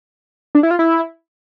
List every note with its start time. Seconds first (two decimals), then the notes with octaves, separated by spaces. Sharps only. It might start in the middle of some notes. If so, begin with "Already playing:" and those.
0.55 D4
0.63 E4
0.71 F4
0.79 E4